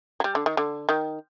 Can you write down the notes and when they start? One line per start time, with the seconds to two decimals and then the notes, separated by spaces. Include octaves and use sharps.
0.20 F#3
0.24 G3
0.35 D3
0.46 D#3
0.57 D3
0.89 D#3